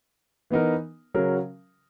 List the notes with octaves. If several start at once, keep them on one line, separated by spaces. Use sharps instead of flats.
E3 B3 D#4 A#4
C#3 F#3 C#4 F#4 A#4